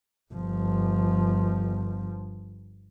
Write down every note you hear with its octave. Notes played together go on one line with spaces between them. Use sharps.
G1 F3